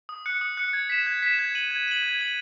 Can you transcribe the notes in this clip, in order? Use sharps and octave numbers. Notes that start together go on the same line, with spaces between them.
D#6
F#6 C#7
D#6
F#6 C#7
G#6
B6 E7
G#6
B6 E7
G#6
D#7 F#7
G#6
D#7 F#7
G#6
D#7 F#7